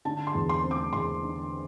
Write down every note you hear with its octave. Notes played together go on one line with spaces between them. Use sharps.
D3 A5
C6
E2
C6
C4
D6
E2 C6
D3